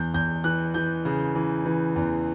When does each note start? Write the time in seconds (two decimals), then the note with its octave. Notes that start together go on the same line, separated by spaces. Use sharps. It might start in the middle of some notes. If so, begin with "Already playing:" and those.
Already playing: E2 G6
0.14 E2 G6
0.44 E3 F#6
0.74 E3 G6
1.05 C#3
1.35 E3
1.65 E3
1.96 E2